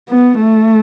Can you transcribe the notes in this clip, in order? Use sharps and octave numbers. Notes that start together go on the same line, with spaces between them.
B3
A3